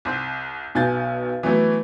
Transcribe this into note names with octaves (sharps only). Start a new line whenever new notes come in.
C2 C4
B1 B2 G#5 F#6 G6 A6
E3 F#3 A3 B3